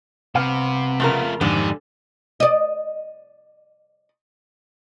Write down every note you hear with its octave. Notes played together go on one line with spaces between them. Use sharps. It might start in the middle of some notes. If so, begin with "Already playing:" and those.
C2 C3 B3 F5
F2 C#3 A3 F4 A#4
F2 G#2 D3 D#3 G4 D5 G#5
D5 D#5